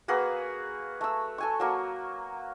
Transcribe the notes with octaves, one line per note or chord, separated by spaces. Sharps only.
A#3 F#4 G#4 B4
A3 E6
A4 G#5 C#6
F#3 A#3 F#4